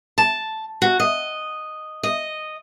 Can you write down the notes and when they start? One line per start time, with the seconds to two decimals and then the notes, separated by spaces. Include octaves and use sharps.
0.18 A5
0.82 F#4
1.00 D#5
2.03 D#5